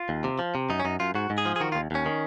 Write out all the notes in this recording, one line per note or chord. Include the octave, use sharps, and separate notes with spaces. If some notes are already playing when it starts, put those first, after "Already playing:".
Already playing: F4
D#2
C3
F3
C3
F#2 D#4
C#4
F#2 D#4
F#2 F4
G#2 F#4
G#2
G#4
F3
G#4
D#3 F#4
F4
D#2
D#2 C#4
D#3